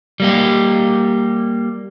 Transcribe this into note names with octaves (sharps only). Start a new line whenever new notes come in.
G3 A#3 G4